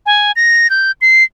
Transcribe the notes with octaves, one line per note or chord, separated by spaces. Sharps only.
G#5
A#6
G6
C7